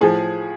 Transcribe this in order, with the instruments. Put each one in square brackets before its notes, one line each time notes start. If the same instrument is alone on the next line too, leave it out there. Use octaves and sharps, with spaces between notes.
[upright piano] A2 F3 G#4